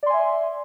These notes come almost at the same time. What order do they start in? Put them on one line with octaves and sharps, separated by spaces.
D5 C6 G#5 E5